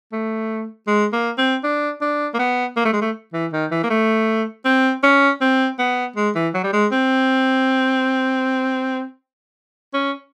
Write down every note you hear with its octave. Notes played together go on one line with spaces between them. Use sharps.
A3
G#3
A#3
C4
D4
D4
A#3
B3
A#3
A3
G#3
A3
E3
D#3
E3
A#3
A3
C4
C#4
C4
B3
G#3
E3
F#3
G3
G#3
C4
C#4